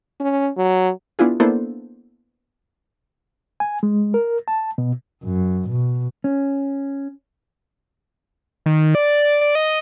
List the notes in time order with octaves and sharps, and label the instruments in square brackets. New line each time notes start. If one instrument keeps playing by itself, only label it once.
[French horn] C#4
F#3
[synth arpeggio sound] B3 D4 E4 F4 G#4
A#3 B3 D4 E4 A4 C5
[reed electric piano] G#5
G#3
A#4
A5
B2
[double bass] F#2
B2
[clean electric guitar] C#4
[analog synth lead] D#3
D5
D5
D#5